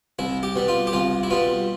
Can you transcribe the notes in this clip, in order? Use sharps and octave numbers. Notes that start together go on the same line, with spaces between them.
C2 E4
G4
B2 G3
F4
G4
C2 F4
E4
B2 G3 F4